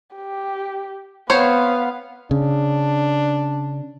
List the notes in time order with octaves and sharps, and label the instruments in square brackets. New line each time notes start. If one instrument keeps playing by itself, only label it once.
[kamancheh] G4
[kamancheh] B3 F5 [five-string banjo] C4 C5 C#5
[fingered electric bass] C#3 [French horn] D4